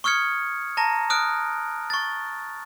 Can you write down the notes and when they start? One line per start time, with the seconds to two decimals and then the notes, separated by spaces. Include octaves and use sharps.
0.04 C#6 D#6 F6 G#6 C#7
0.77 A5 A#5 A#6
1.10 D#6 F6 F#6 D7
1.90 C#6 A6